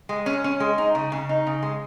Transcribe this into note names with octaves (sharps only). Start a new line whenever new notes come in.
G#3
C#4
C#4
G#3
D#4
C#3
C#3
D#4
C#3
G#3